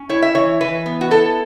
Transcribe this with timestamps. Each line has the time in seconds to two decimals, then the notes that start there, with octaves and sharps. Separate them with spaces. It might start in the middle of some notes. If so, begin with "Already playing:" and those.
Already playing: C#4
0.09 E4 C#5
0.22 E5
0.35 E3 C#5
0.61 E3 B4
0.86 B3
1.01 F#4
1.11 E4 A4